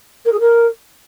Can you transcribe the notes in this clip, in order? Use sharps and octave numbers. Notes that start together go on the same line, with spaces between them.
A#4
G#4
A#4